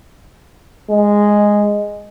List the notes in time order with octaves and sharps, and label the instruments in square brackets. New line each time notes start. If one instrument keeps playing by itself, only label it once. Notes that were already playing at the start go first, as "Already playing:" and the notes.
[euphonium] G#3